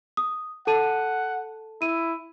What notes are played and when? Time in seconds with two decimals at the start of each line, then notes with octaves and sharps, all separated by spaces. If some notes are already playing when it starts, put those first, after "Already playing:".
0.17 D#6
0.67 A4 F#5 A5 D#7
1.82 E4 D#7